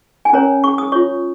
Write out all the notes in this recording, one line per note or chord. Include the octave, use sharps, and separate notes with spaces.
G#5
C#4 A#4 C#5 A#5
C#6
D#6
F4 C#5 C#6